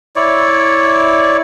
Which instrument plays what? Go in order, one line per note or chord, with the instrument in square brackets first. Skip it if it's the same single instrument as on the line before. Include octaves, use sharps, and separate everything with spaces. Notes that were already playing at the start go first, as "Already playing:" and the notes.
[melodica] E4 C#5 D5